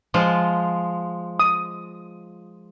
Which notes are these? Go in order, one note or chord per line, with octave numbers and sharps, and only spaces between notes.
F3 G#3 F4
D#6